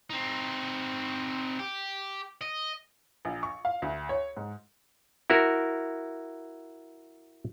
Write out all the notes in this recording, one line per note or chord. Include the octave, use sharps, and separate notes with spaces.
C4 D#4
G4
D#5
A#1
C#6
F5
D2
C#5
G#2
E4 F#4 A#4